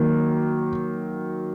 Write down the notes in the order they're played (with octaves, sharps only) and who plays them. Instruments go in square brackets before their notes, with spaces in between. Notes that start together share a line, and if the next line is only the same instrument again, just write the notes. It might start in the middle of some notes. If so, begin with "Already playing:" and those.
Already playing: [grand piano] D#3 F#3 A#3